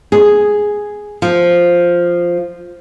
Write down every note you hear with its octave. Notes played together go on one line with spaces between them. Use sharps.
G#4
F3